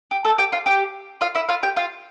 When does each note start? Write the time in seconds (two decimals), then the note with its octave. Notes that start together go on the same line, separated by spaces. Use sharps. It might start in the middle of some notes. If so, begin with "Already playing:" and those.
0.11 G4
0.25 A3 A4
0.38 G4 G5
0.52 F4 F5
0.66 G4 G5
1.21 F4 F5
1.35 E4 E5
1.49 F4 F5
1.63 G4 G5
1.76 F4 F5